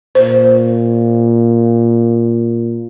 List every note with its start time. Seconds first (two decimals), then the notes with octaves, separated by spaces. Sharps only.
0.15 A#2 C5